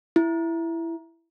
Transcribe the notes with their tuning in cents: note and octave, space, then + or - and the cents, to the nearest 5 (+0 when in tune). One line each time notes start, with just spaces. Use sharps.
E4 +10